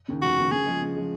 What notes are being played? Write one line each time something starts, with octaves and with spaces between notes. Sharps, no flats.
D#2 C#3
F1 F#4
D#2 C#3
C#3 G#4
F3 G#3
C#3
F3 G#3